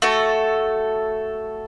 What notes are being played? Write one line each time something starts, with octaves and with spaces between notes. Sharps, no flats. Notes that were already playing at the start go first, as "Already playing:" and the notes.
A3 F#4 A4